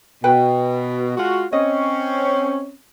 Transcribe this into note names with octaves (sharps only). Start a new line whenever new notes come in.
B2 B4 G5
G#3 F4 F#4
C4 C#4 D#5